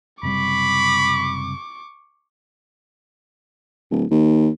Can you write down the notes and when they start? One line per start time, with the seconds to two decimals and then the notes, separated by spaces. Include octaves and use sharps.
0.23 F#1 C3 G3 B5 C#6 D6
3.91 D1
4.11 D#2